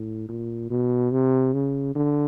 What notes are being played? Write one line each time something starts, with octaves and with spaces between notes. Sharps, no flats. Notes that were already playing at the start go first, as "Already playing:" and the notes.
Already playing: A2
A#2
B2
C3
C#3
D3